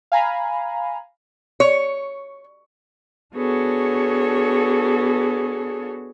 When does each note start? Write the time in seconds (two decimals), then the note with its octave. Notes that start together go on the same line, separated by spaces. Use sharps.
0.12 F5 G#5 A#5 B5
1.60 C#5
3.35 B3 D4 F#4 G#4 A4 C#5